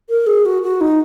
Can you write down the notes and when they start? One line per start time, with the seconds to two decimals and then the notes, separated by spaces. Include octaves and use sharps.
0.10 A#4
0.27 G#4
0.46 F#4
0.62 F#4
0.81 D#4